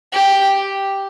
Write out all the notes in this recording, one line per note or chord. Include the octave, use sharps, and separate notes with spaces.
G4